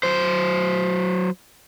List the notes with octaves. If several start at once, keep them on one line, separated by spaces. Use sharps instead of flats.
F#3 C5